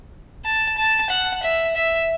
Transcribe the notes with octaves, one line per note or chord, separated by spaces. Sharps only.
A5
A5
F#5
E5
E5